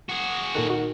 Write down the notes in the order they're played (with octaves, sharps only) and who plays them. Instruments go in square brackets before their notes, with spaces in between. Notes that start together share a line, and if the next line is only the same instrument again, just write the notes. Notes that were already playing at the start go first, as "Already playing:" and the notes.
[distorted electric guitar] F#4 G#4
[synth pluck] A#2 A4 F#6 [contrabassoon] D#3
[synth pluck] F#4